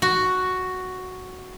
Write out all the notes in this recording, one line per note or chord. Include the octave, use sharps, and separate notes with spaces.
F#4